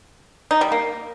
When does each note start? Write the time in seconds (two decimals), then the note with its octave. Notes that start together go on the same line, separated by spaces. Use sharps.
0.51 D#4
0.61 G3
0.72 A#3